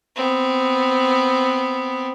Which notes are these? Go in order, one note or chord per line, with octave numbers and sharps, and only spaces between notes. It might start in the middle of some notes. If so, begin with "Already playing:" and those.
B3 C4